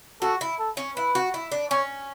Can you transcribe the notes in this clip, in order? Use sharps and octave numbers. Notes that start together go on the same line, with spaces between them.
F#4 A4
E4
A4
C#4
E4 B4
F#4
E4
D4
C#4 C#5